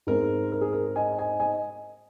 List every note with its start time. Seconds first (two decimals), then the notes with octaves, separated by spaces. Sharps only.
0.07 G#2 G#3 C4 A#4
0.52 A#4
0.61 G#4
0.73 A#4
0.95 D#5 G#5
1.19 D#5 G#5
1.40 D#5 G#5